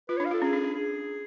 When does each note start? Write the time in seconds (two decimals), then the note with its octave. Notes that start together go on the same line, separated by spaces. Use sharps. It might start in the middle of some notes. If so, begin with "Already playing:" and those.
0.09 F4 B4
0.17 C#5
0.20 D4
0.26 F5
0.31 F4 A4
0.42 C#4 G#4
0.53 D4
0.64 D4
0.75 G#4